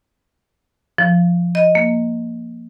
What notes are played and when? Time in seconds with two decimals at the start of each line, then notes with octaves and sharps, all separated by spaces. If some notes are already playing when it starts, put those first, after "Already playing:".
0.98 F3
1.55 D#5
1.75 A#3